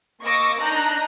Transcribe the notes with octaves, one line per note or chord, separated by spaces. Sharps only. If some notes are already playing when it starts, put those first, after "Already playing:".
A#3 D#5 C#6 D6 E6 A#6
D4 D#4 A#5 F#6 G6